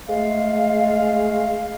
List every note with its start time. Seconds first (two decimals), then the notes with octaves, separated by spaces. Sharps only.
0.07 G#3 A3 F5